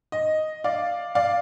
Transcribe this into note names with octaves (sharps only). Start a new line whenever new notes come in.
D#5
D5 F5
D5 F5